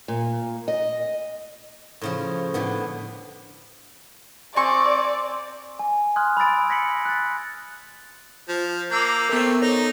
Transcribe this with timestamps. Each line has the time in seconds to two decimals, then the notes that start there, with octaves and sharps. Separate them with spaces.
0.08 A#2
0.68 D#5
2.01 A2 C#3 F3
2.54 A2 D3 B3
4.56 C4 C5 D5 G#5 C#6
5.79 G#5
6.16 G#5 C6 D#6 F6 F#6 G#6
6.37 B5 C6 E6 A6 D7
6.69 G#6 A#6 B6 C#7 F#7
7.05 F#6 A6
8.49 F3
8.91 A#3 D6 E6 G6
9.29 A3 B3 C4 A#4
9.62 D#4 A4 C#5